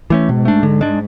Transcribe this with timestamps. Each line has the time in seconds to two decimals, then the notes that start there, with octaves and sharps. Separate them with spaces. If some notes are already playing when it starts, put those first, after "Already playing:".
0.10 E3 A3 C#4
0.28 G#2 B2
0.45 A3 D4
0.63 D3
0.81 G#3 D4